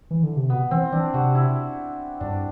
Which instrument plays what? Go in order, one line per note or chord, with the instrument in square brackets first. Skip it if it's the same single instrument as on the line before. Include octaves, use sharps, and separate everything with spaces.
[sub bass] E3
D3
C3
[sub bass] B2 [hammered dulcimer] B3
[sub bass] E3 [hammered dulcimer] C4
[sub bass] E3 [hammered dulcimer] D4
[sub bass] C3 [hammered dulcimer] F#4
[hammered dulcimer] E4
[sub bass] G2 [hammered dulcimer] D4